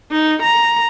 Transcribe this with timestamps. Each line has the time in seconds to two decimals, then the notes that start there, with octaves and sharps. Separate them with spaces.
0.11 D#4
0.42 A#5